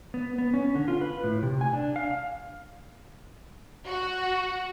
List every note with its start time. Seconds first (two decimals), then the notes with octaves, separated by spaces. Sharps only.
0.14 B3
0.38 B3
0.54 C#4
0.75 D3
0.88 F4
1.01 B4
1.24 A2
1.43 C3
1.61 G#5
1.73 D4
1.96 F5
2.11 F5
3.86 F#4